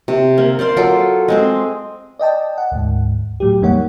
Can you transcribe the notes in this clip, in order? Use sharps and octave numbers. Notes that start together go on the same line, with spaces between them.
C3
A#3
C5 D5 F5 C6
F#3 F4 A4 D6
G#3 C4 G#4
D5 D#5 G5 A5
F#5
D2 G#2
A2 F#3 G4
F2 D#3 G3 A#3 C#5 F#5